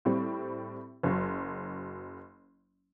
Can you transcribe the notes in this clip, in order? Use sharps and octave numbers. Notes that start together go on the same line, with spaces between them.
A2 G3 C4
F#1 F#3